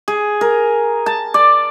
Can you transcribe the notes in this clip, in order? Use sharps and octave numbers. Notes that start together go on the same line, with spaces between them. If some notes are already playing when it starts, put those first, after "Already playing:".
G#4
A#4
A5
D5